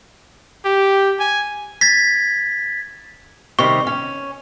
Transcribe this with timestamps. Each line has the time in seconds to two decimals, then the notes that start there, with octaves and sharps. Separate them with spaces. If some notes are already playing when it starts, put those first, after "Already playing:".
0.65 G4
1.20 G#5
1.81 G#6 A6 B6
3.59 C3 D#3 G3 C#6
3.87 C#4